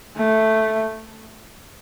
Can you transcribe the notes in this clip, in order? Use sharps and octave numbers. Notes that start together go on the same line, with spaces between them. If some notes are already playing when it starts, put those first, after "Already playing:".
A3